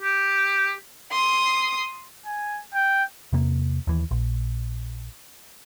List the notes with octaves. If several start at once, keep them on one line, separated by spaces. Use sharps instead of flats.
G4
C6 D#6
G#5
G5
E2 C3 A#3
D#2 E3
A#1